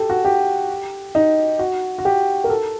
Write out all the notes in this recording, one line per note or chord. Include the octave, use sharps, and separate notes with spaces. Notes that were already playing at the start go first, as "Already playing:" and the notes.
Already playing: G4 A4
F#4
G4
D#4
F#4
F#4
G4
A#4
A4